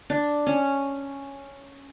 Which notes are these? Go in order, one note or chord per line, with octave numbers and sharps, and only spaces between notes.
D4
C#4